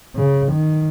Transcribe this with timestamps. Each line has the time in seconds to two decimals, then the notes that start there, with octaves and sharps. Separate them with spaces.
0.16 C#3
0.52 D#3